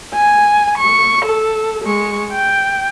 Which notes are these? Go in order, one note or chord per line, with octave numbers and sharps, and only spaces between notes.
G#5
C#6
A4
G#3 C#6
G5